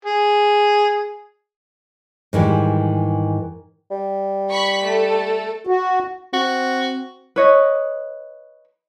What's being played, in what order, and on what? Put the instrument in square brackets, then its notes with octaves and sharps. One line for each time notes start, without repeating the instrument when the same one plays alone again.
[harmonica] G#4
[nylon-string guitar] G#2 D#3 E3 G3
[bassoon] G3
[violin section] B5 C#6 B6
A3 A4
[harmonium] F#4
[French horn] C4 [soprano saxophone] F#4
[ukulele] B4 C#5 D#5